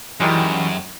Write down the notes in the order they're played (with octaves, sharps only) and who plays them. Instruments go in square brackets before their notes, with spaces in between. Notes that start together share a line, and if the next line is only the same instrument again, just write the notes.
[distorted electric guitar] F#2 [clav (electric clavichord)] D#3 G3 G#3 [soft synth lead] E3 [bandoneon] C#4 E4 F#4